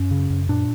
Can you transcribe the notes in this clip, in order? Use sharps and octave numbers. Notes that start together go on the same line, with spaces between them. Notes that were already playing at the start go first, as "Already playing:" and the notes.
Already playing: F#2 C#4
C#3
F#2
A#2 D4